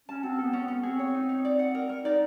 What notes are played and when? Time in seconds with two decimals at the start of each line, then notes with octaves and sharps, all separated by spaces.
0.08 C#4 A5
0.23 C4 F#4
0.38 B3 A4
0.53 C#4
0.64 B3 C#4
0.83 C4 G#4
0.99 C#5
1.14 D#4
1.29 D#4
1.45 D5
1.59 F#5
1.75 A#4
1.89 A#4
2.04 D#4 D5